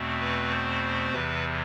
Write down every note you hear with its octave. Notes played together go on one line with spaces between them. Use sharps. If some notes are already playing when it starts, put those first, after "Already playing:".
Already playing: E2 B2 A3 C4
B4
C5
E2 C3 E3 B4